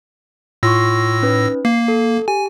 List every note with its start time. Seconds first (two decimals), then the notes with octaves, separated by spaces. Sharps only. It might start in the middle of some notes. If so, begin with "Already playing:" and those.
0.63 A2 F4 C6 C#6 E6 A#6
1.23 C#4 D#4 B4
1.65 A#3 C7
1.88 A4
2.28 G4 G#5